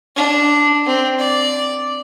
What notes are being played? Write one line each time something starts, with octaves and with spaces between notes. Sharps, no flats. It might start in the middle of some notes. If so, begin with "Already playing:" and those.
D4
C4
D5